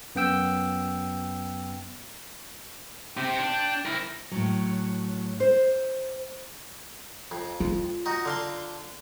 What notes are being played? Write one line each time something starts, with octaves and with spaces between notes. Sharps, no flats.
F#2 B3 G5 E6
C3 G5
D4
E4 A#4
A2 F#3
C5
F2
F4
D#4 F#4
D3 F5 C6